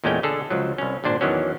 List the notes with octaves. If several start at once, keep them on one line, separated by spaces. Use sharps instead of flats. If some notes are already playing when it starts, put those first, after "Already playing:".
E2 A#2 G#3 A3 C#4 G5
D3 G#4 A4
C#2 F3 F#3
C2 C#4
G#1 A#2 D4 C5
E2 D#3 E3 F#3 C#4